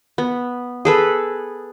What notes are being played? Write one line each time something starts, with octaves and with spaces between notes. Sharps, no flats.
B3
G#4 A4 B4